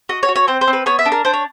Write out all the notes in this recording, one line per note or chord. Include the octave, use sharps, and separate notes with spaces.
F#4 D#5
C#5
F#4
C#5
C4 C5
C5
C4
B4
B3 C#5
E5
D4
A#4
D4 C5
C#5